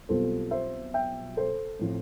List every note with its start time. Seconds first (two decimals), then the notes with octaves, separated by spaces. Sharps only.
0.09 B1 B2 G3 C4 F4 A4 C5
0.51 C5 E5
0.94 E5 G5
1.37 A4 C5
1.79 A2 F3 C4 E4